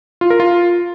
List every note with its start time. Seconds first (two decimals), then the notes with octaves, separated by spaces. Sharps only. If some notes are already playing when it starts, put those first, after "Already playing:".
0.21 F4
0.30 A#4
0.40 F4